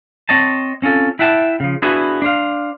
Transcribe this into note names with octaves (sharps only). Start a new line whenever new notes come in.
C4 C#5 D#5 A5
C4 C#4 F4 A4
E4 E5 F#5 G5 A5
C#3 F3
B3 D4 E4 F#4 G#4 B4
D4 C5 F5